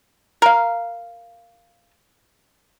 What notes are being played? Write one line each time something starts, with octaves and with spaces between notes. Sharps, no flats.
A#4 F5